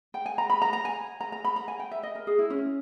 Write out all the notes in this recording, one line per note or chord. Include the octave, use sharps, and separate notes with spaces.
G5
G#5
A#5
B5
A#5
A#5
G#5
A#5
A#5
B5
A#5
G#5
G5
E5
D#5
A#4
G#4
E4
C#4